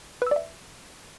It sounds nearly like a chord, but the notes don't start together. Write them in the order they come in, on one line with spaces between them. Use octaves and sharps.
B4 E6 D5 E5